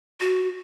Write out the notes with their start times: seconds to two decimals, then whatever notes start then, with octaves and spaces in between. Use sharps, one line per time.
0.20 F#4